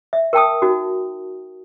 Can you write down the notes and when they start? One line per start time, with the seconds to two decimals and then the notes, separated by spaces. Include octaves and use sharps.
0.13 E5
0.33 A#4 G5 A5 D#6
0.62 D#4 F#4